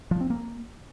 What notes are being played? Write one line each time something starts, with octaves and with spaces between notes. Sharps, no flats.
F3
C4
A#3